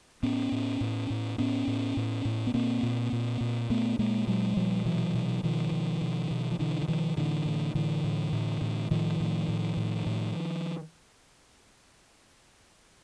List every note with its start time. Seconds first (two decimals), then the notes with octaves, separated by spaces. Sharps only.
0.23 A2 B3 C#4
0.52 A2
0.81 A2
1.10 A2
1.38 A2 B3 C#4
1.67 A2
1.97 A2
2.25 A2
2.47 B3
2.54 A#2 A#3 C4
2.83 A#2
3.12 A#2
3.41 A#2
3.70 A#2 A3 B3
3.99 A#2 G#3 A#3
4.27 A#2 F#3 G#3
4.57 A#2 F3 G3
4.85 B2 E3 F#3
5.14 B2
5.43 B2 D#3 F3
5.72 B2
6.02 B2
6.31 B2
6.51 F3
6.59 B2 D3 E3
6.82 E3
6.88 B2 D#3 F3
7.16 A2 D3 E3
7.45 A2
7.75 A2 D3 E3
8.04 A2
8.33 A2
8.61 A2
8.91 A2 D#3 F3
9.20 A2
9.48 A2
9.77 A2
10.06 A2